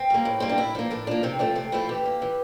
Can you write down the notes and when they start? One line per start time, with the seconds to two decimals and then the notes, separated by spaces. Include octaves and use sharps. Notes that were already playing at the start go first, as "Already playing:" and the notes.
Already playing: C4
0.10 G3 A#3
0.25 A2
0.40 G3 A#3 C4
0.49 D4
0.58 A2 E4
0.75 F3 A#3 D4
0.91 A2 D4
1.07 F3 A#3 D4
1.23 C3 C4
1.39 F3 A3 C4 D4
1.56 C3 C4
1.72 F3 A3 C4 E4
1.89 E3 G4
2.06 A#3
2.22 E3